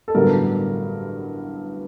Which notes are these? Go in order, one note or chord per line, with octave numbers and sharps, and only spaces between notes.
A4
A1 G2 D3 F#3 B3 A#4